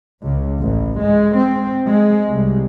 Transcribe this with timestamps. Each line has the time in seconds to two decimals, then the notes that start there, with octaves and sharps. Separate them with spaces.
0.25 C#2
0.61 A1
1.03 G#3
1.37 C4
1.87 G#3
2.31 C2